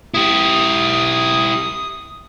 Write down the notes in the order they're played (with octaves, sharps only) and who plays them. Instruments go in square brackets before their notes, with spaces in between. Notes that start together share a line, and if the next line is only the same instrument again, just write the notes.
[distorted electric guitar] E4 G4 [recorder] D#6